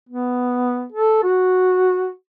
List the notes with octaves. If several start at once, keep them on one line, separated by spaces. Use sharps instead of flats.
B3
A4
F#4